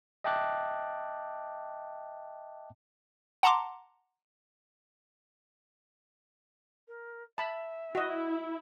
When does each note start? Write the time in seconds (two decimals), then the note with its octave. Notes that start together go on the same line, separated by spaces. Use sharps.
0.24 D#5 E5 G5 A5 D6 F#6
3.43 F#5 A5 A#5 C6 D6
6.88 A#4
7.38 E5 A5 B5
7.95 E4 F#4 D#5